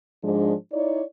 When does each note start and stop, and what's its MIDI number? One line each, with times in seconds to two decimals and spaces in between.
0.24 0.54 44
0.24 0.54 53
0.24 0.54 56
0.24 0.54 62
0.73 1.02 63
0.73 1.02 64
0.73 1.02 73
0.73 1.02 74